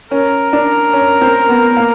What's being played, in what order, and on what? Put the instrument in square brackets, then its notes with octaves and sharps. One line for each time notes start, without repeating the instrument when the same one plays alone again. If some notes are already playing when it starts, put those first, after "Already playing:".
[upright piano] C#4 [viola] A#4
[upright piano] D4
C#4
C4
B3
A#3